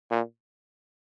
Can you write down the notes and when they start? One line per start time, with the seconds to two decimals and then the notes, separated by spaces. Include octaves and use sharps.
0.11 A#2